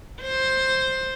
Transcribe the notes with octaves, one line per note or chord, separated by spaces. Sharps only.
C5